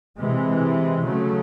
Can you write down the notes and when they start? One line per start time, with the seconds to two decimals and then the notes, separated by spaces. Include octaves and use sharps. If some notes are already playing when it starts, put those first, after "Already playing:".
0.17 C3 E3 G#3
1.04 C#3 F#3 A3